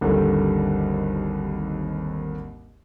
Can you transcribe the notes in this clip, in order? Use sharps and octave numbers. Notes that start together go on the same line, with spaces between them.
G#1 D#2 D3 D#3 G3